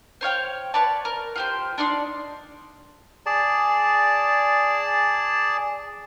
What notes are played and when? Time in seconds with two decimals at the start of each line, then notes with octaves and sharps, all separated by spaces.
0.21 C5 C#5 F5 G5
0.74 B4 C#5 D5 A5
1.05 A#4
1.36 F4 G4 C5
1.78 D4 D#4 D5 C6
3.26 G#4 D5 A5